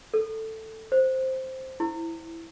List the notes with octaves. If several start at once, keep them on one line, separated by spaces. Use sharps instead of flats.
A4
C5
E4